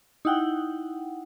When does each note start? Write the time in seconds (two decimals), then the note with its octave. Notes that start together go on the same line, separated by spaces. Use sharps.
0.25 D#4 E4 F#5 G5